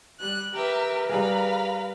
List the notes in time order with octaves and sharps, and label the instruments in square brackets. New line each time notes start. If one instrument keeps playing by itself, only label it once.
[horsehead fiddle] G3 [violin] F#6
[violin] G4 E5 [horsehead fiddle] A#4 B4
[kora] G3 G#4 [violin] F5 B5